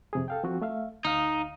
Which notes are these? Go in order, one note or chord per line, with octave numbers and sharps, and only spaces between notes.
F2 C3 G#4
A4 F5 G5
F3 C4 F#4
A3 E5 F5
D2 D#4 F5